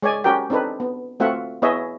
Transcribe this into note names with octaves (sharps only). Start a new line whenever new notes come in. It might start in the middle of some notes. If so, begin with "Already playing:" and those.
G#3 C#5 D5 G#5
C#4 F#4 G4 A#4 G5
C4 D4 D#4 A4 B4
B3
A3 C4 F4 F#4 E5 F#5
B3 E4 G#4 C#5 D#5 E5